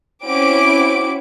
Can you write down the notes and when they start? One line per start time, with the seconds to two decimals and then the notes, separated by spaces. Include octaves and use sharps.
0.25 C4 C#4 E4 F#4 D6 D7